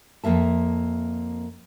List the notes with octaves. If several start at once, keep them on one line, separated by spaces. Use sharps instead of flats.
F2 G#2 A#3 E5 A5